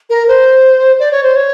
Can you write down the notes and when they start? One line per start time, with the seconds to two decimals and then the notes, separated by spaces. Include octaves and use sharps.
0.10 A#4
0.28 C5
0.99 D5
1.12 C#5
1.23 C5
1.36 C#5